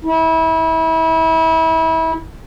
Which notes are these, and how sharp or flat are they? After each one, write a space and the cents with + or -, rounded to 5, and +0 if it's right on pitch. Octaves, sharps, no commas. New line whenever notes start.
E4 -30